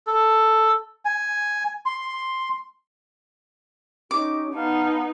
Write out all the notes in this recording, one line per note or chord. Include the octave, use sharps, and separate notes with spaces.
A4
G#5
C6
C#4 D#4 G4 D6
B3 D#4 F5 A5 F6